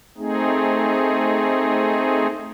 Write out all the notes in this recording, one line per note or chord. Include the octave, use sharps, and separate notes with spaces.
A3 C4 D#4 G#4